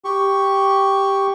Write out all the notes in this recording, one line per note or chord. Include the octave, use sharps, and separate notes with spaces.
G4 C#6